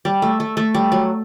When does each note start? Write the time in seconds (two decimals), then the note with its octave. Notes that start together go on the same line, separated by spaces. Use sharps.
0.05 G3
0.22 A3
0.40 A3
0.57 A3
0.74 G3
0.92 F#3